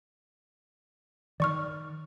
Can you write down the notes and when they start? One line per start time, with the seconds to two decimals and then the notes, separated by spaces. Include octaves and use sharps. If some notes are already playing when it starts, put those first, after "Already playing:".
1.40 D#3 D5 C#6 F6